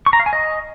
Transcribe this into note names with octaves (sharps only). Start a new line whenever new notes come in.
C#6
A#5
F5
G#5
D#5